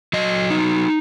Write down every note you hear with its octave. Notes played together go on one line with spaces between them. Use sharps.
F#3 D#5
D#4